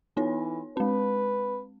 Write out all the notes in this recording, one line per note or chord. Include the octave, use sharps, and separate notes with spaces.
E3 B3 D#4 C#5
G#3 C4 B4